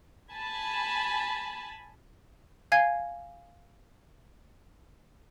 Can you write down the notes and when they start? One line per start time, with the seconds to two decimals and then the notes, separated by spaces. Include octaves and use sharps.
0.33 G#5 A5 B5
2.72 F5 G#5 G#6 C7